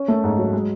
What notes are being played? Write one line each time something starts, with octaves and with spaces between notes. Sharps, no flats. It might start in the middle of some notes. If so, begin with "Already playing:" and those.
Already playing: C#4
A3
G#2
F#3
G#3